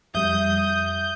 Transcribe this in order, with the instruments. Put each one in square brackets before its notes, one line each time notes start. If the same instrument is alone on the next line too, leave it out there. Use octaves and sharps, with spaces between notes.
[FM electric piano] F2 G3 [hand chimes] E5 [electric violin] D#6 [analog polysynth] G6